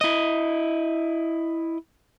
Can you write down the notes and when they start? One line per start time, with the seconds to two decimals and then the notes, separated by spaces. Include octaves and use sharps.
0.01 E4 D#5